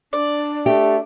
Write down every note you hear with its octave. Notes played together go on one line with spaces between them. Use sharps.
D4 D5
A3 G4